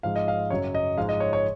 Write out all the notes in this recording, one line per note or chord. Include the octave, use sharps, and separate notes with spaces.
G#2 F3 G#3 F5
D#5
F5
F#2 C#3 F#3 C#5
D#5
G#2 F3 G#3 F5
D#5
C#5
C#5